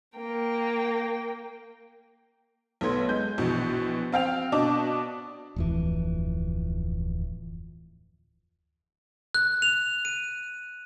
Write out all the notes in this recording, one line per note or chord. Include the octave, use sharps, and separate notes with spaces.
A#3 G5
B1 A3 B3 C6 G#6
G#3 G6
A#1 B2 E3
C4 F5 G5 F7
B2 D4 D5 D#5 A5 D6
D1 F2 E3
F#6
F7
D#7